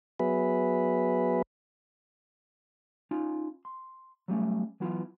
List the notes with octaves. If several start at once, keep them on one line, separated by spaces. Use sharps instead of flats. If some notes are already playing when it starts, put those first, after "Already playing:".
F#3 B3 G#4 B4 E5
C#4 D#4 F4
C6
F#3 G3 A3 C#4
E3 F#3 B3 E4 F4